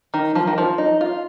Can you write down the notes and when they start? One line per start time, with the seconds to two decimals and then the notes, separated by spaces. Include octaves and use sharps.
0.14 D#3
0.35 F3
0.47 D#3
0.58 F3
0.78 D#4
1.01 F4